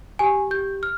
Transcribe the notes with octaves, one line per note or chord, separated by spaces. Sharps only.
G4 G#5
G4 G6
F6